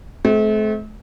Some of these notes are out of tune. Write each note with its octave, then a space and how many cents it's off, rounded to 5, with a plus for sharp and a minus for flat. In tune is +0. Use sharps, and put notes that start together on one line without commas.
A3 -40 C4 -10